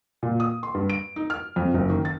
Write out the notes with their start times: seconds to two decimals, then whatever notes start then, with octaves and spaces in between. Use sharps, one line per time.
0.23 A#2
0.40 D#6
0.63 C6
0.74 G2
0.90 D7
1.16 D#4
1.30 F6
1.56 F2
1.74 F#1
1.90 D#3
2.05 A6